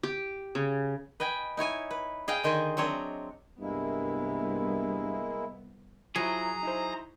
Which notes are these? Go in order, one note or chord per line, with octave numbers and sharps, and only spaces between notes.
G4
C#3
B4 D#5 G5 G#5
D#4 E4 C#5 G#5
B4
G#4 D#5 F5 G5
D3 D#3 C5 D#5 G#5
F#3 C4 D4 C#5 D#5 E5
C2 G2 G#3 A#3 B3 E4
F3 F#3 E4 G#4 A#5
D#4 E4 C5